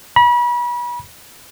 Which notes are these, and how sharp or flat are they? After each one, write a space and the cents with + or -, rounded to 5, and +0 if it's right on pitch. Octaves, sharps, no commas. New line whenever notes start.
B5 -35